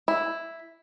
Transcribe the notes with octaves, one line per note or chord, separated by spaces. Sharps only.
E4